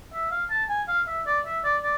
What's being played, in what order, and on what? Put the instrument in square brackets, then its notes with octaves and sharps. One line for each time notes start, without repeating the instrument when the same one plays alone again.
[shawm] E5
F5
A5
G#5
F5
E5
D5
E5
D5
D5